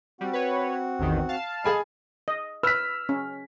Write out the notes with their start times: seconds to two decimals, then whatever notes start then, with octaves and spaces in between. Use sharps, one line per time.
0.21 G3 C4 F#4 F#5
0.33 B4 C#5
0.99 A1 E2 D#3
1.29 F5 A5
1.65 G#4 D#5 G#5 B5
2.28 D#5
2.63 B4 E6 F6 B6
3.09 C#4